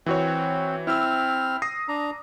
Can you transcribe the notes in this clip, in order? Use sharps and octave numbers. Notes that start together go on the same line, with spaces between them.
E3 C4 F#4 C#5
C4 E4 E6 F6
D#6 A#6 C7
D4 A#5